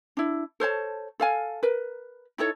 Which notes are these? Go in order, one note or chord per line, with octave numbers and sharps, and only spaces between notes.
D4 E4
A4 C5 C#5 A5
A4 F5 G#5
A#4 B4
D#4 E4 A4 C#5